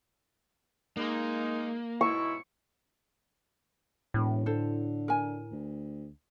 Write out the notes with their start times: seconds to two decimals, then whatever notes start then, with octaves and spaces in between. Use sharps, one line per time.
0.97 G#3 A#3 D#4
2.01 G#2 B2 E4 C#6
4.14 E1 A2
4.46 D3 A4 C5
5.08 A#4 G#5
5.51 D2